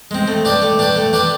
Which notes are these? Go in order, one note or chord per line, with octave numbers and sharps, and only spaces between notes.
G#3 C4
A3
D4 G4 B4 D5
A3
D4 G4 B4 D5
A3
D4 G4 B4 D5